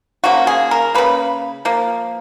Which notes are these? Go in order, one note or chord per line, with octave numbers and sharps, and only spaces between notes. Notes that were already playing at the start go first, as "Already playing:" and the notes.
C#3 F3 A#3 F#4
G#4
A#4
C#3 F3 A#3 B4
F3 A#3